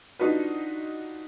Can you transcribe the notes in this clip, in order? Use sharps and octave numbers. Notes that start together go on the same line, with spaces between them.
D4 D#4 F4 F#4 B4